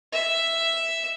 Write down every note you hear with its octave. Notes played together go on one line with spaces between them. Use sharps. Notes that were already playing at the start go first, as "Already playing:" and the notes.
E5